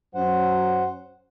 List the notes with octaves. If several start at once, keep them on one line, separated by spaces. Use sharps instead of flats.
F#2 F#3 C#4 C5 F#5